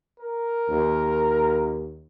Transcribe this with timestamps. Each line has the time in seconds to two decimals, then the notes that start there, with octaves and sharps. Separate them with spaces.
0.20 A#4
0.69 D#2